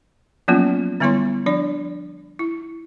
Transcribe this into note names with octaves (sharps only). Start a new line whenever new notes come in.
F3 F#3 A#3 B3 C#4 F4
D3 G3 B3 E4 C#5 C6
F3 D4 D5
E4